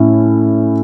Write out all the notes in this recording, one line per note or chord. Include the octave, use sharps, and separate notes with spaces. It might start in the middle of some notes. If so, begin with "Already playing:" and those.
Already playing: A2 C#4 E4